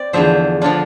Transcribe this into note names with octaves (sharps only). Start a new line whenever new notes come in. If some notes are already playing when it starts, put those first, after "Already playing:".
Already playing: C4 D5
E2 D3 F3 C5 E5
D3 F3 D4 F4